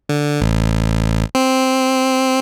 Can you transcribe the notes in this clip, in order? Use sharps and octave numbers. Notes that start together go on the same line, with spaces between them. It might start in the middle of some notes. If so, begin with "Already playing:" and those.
D3
A1
C4